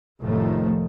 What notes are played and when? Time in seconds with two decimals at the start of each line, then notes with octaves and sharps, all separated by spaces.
0.20 F1 A2 D#3 F3 A3